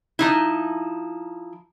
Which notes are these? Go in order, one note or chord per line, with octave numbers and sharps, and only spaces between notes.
F3 D#4 E4